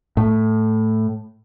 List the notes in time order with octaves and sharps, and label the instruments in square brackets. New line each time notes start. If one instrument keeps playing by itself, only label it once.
[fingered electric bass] A2